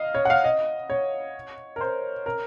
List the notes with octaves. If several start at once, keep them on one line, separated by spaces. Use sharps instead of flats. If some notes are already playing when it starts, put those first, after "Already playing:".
Already playing: D#5 F5
C#5
F#5
F5
D#5
C#5
A#4
C5
A#4